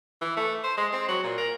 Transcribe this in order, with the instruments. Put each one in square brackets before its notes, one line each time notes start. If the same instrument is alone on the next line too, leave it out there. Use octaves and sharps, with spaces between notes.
[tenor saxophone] E3
A3
C5
G#3
C4
F#3
A#2
A#4